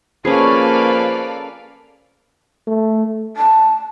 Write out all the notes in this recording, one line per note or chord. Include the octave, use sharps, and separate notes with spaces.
F3 A#3 C#4 G#4 A4 B4 D5 F5
A3
A5